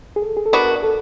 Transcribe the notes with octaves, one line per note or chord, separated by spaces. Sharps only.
G#4
A4
G#4
A4
B3 D4 F#4 A#4
A4